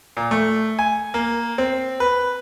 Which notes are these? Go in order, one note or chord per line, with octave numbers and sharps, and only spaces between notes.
A#2
A3
G#5
A#3
C4
B4